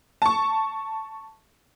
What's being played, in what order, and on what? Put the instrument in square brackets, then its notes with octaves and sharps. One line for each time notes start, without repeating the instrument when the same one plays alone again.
[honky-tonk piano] A5 C#6